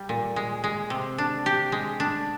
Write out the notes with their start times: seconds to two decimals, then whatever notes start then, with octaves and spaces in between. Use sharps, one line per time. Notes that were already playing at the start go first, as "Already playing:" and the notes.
Already playing: G3
0.09 A#2
0.36 G#3
0.64 G#3
0.90 C3
1.18 D4
1.46 G4
1.72 G#3
2.00 D4